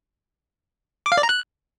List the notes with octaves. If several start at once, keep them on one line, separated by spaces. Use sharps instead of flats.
D6
F5
D5
A#5
F#6